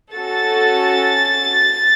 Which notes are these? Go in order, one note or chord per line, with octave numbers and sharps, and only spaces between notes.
C#4 F#4 A4 A6